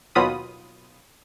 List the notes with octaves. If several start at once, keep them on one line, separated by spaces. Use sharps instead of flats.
D#2 B2 F#3 F4 B5 D#6